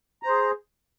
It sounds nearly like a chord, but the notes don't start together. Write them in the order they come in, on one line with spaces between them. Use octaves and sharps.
A#5 C5 G#4